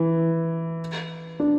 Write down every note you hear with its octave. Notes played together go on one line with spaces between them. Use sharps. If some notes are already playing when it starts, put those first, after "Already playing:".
Already playing: E3
D4